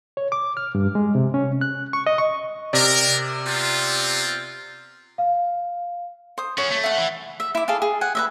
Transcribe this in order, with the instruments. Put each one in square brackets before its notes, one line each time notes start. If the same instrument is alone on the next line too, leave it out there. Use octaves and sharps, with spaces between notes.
[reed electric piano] C#5
D6
F6
G2
G#3
C3
C#4
F#6
C#6
D#5
C#6
[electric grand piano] C3 D5 [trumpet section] A#4
[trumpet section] B3 C4 F4
[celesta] F5
[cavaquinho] C5 D#6
[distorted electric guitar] C#4 F#4 [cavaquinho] C#5
[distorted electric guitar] A3
[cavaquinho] E5 F#5
[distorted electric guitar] E3
[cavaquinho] E5
E4 D6
G#4 A4 D5 F5
G#4
F#5 G#5
B4 D#5 E5